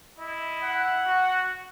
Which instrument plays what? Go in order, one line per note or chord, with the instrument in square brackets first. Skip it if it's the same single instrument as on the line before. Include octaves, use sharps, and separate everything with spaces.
[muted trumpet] E4 [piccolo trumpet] D#5
[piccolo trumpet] F#5
[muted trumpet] F#4